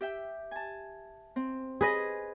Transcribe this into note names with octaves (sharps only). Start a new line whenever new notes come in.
G4 E5 G5
G#5 A5
C4
G#4 B4 D#5